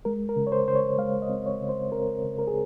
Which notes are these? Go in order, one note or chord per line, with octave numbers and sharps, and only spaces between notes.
G#3 A#4
A#4
C#3
C#5
C5
C#3 C5
C#5
G#3 F5
D#5
C4
C#5
C#3
C5
C4 A#4
C#3
A#4
G#4